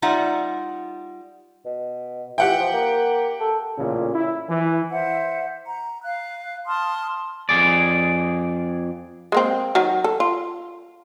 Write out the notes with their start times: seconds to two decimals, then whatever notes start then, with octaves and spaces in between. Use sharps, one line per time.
0.02 G3 D#4 F4 E5 F#5
1.65 B2
2.38 E3 G4 F#5 G5
2.59 F3
2.73 A#3
3.40 A4
3.78 A1 A#2 C#3
4.15 E4
4.49 E3
4.90 C5 E5 F#5
5.66 A#5
6.04 F5 F#6
6.67 A5 C6 D#6 F6
7.49 F2 A#2 G#4 D5
9.32 G#3 A#3 C4
9.75 D#3 F#3 F#4
10.04 A4
10.20 F4